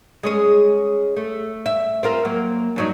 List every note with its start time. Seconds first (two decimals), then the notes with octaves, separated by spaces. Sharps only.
0.23 G#3 C#4 G#4
1.16 A3
1.66 E5
2.03 C4 F4 A#4
2.25 F#3 A#3
2.76 G2 F#3 D#4